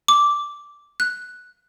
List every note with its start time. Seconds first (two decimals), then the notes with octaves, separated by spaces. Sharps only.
0.08 D6
1.00 F#6